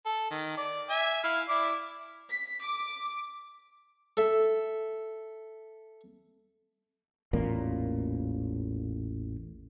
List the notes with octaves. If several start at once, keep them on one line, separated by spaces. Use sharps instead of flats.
A4
D#3
D5
E5 G#5
E4 F5
E4 D5 D6
B6
D6
A4 E5
A1 E2 A#2 A#3